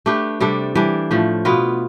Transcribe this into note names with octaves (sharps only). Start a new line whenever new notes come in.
A3 D4 G4 B4
C3 G3 D4 A4
E3 G3 D4
A2 F3 A3
B2 B3 F4 B4